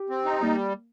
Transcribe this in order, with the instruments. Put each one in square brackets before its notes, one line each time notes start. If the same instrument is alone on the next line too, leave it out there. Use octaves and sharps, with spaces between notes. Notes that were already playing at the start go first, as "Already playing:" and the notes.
Already playing: [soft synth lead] G4
[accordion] C4
D#4
[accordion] G3 [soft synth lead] A#3